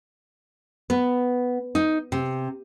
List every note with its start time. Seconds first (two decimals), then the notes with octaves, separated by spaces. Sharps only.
0.90 B3
1.75 D#4
2.12 C3